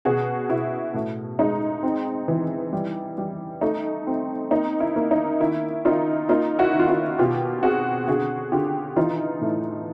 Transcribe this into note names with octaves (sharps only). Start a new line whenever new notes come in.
B2 F#4 G#4
B2 E4 F#4
A2
G#3 D#4
C4
E3
G3
G3
A3 D#4
C4
A#3 D#4
E4
A#3
D#4
D#3 E4
D#3 D#4 F4
A#3 D#4 F4
E4 F#4
D#3
F4
E4 F#4
B2 F4 G4
C4 F#4 G#4
D3 F#4 G#4
D3 F4 G4
E3 D#4 F4
A2